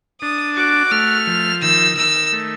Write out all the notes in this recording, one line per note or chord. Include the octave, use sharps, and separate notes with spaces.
D4 D#6
F#4 D6
A3 F6
F3
D#3 E6
D#3 E6
A3